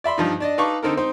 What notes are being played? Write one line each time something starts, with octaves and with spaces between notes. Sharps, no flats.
D5 E5 B5 C6
G2 F3 D#4
D4 D5 D#5
D#4 B4 F5 A5 C#6 D6
D3 C4 D#4 A4 A#4
C4 D#4 C5